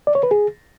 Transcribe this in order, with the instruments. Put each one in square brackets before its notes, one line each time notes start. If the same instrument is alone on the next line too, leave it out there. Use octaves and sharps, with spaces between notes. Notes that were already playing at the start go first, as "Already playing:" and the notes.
[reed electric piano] D5
C#5
B4
G#4